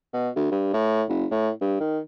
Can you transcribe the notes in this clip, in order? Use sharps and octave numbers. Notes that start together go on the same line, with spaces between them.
B2
D2
G2
A2
F#1
A2
G2
D#3